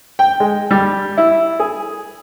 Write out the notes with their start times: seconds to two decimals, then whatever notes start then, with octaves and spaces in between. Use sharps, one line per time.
0.19 G5
0.40 G#3
0.71 G3
1.18 E4
1.60 G#4